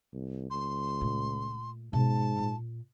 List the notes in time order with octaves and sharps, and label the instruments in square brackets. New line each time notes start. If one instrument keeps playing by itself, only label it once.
[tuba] C2
[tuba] C#2 [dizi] C6
[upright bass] A#2 A3
[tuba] G#2 [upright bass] B2 [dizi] A5
[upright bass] A#2